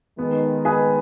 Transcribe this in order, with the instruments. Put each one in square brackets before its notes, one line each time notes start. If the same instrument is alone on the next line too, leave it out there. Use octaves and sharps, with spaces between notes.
[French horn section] D#3 G#3 [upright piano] B3
[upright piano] G#4 B4